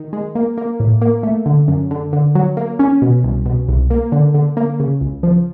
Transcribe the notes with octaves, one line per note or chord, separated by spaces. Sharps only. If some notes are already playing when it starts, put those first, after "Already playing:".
Already playing: D#3
G#3
A#3
A#3
A2
A#3
A3
D3
F#2
D3
D3
F#3
A#3
C#4
B2
C2
B2
C2
A#3
D3
D3
A#3
C#3
C#2
F3